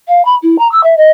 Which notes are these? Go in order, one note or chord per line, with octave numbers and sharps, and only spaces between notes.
F5
B5
E4
A#5
E6
E5
D#5